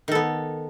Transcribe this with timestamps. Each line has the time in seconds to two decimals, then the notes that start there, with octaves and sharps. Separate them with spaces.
0.08 D#3
0.11 A4
0.15 B3